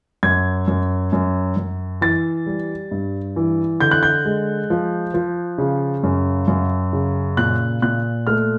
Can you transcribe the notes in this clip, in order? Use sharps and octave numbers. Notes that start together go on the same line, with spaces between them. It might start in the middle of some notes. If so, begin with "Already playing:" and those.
F#2 G#6
F#2
F#2
F#2
E3 A6
G3
G2
E3
D3 G6
F#6
G6
G#3
F3
F3
C#3
F#2
F#2
C#3
A#2 F#6
A#2 F#6
A3 F6